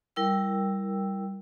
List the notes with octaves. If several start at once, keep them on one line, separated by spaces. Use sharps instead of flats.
G3 E4 A#4 G5 E6